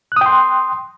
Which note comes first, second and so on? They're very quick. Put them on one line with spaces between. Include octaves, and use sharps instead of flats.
F#6 D#6 G5 C6